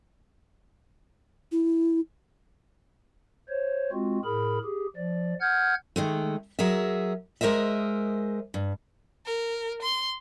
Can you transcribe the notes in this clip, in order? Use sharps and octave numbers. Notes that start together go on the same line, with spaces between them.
E4
C5 C#5
G#3 C4 F4 F#4
A2 G#4 A#4 B5
G4 G#4
F3 D5
F#5 F6 G6 G#6
D#3 G#3 A3
F#3 G#4 A#4 E5
G#3 A#4 C5 D#5 E5
G2
A#4
C6